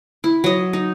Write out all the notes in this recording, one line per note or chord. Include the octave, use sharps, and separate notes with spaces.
E4
F#3 D#5
D#4